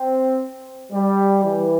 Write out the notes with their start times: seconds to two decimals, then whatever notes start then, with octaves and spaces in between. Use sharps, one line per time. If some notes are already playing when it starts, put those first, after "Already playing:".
Already playing: C4
0.92 G3
1.45 E3